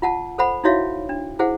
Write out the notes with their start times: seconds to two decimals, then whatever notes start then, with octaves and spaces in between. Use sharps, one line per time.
0.02 F4 F#5 A5
0.38 A4 C5 F#5 B5
0.64 D#4 E4 F#4 C#5 E5 F5
1.09 D4
1.39 E4 G#4 C5 F#5